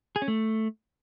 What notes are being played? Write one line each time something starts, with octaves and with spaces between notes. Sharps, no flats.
G#4
C#4
A3